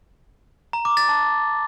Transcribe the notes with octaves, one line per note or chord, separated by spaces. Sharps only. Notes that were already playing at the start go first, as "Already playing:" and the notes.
A#5
D6
A6
A5